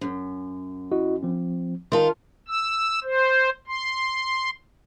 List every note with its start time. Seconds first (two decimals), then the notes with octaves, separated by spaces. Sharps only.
0.01 F#2
0.92 E4 F#4 D#5
1.23 F3 C4
1.92 D#3 F4 A5 C6
2.48 E6
3.04 C5
3.67 C6